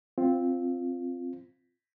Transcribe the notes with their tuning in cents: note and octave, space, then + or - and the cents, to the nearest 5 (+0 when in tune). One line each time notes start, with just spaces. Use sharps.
C4 +0 F4 +0